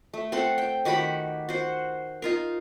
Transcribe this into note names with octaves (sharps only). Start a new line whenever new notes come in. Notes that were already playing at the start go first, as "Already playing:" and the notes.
A3
C4 A4 F#5 C6
G5
D#3 F#4 G4 B5
F#4 C5
D#4 F4 A#4